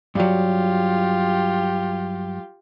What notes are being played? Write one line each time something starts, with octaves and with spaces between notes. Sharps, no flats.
G2 F#3 F4 G4